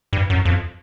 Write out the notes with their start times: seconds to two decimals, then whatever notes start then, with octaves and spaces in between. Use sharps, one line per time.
0.13 G2
0.30 F#2
0.45 F2